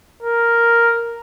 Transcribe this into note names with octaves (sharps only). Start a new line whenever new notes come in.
A#4